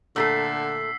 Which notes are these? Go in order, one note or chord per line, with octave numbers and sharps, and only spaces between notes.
A#2 D3 A3 A4 E6 B6 C7